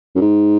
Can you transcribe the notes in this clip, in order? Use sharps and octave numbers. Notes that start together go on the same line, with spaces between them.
F#2
G#2